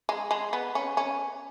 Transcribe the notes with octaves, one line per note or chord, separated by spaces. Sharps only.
G#3
G#3
B3
C#4
C#4